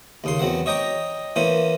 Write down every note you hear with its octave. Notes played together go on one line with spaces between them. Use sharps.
D#2 C#3 C6
E2 F#3 C4 F#5
C#5 D#5 G5 A#5 D6
E3 A#3 C#4 C5